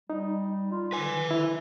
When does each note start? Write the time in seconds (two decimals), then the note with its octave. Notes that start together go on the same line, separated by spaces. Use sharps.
0.10 G3 D#4
0.71 F4
0.92 D3 B4 G#5
1.31 E4